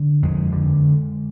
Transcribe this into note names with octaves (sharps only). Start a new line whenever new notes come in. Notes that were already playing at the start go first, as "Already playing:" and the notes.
Already playing: D3
F2 G#3
D3